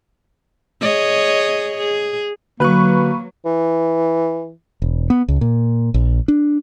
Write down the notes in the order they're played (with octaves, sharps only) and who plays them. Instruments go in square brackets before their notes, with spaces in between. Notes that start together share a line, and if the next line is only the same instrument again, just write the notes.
[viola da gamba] G#4 C#5 D#5
G#4
[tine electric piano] D3 F#4 F#6 [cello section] F#3 [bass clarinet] A#3 [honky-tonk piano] B4 C#6
[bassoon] E3
[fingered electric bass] E1
B3
C#2
A#2
A#1
D4